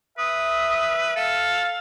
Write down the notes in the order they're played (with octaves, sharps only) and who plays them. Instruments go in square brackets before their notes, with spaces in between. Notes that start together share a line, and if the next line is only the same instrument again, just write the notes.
[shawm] B4 [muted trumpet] E5 [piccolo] D#6
[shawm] A4 [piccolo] F5